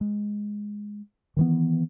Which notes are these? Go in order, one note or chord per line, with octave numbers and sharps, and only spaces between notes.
G#3
D#3 E3 B3